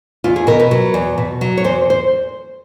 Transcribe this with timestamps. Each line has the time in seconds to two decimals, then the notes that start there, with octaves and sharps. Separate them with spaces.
0.24 E2 F4
0.36 G#4
0.47 B2 A#4
0.60 B4
0.71 F#3
0.94 E2
1.18 B2
1.41 F#3
1.57 C#5
1.64 E2 C5
1.90 C5